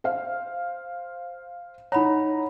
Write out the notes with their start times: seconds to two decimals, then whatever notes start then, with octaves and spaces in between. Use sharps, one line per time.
0.04 C5 F5
1.92 D#4 C#5 F#5 A#5 B5